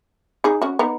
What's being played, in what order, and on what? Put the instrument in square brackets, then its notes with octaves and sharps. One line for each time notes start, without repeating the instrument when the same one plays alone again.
[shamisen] D#4 G#4
C#4 F#4
B3 D#4